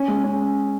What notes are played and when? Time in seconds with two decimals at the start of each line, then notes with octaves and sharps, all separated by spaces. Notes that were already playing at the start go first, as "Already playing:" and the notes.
Already playing: C#4
0.08 G#3
0.24 C#4